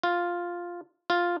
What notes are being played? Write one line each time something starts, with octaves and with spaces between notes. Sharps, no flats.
F4
F4